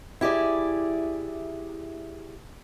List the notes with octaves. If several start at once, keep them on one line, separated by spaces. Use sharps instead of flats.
E4 G4 G#4 D5